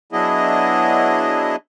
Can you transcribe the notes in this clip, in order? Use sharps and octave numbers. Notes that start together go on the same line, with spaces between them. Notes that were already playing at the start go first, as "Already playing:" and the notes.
F#3 B3 D4 E4 G#4 D#5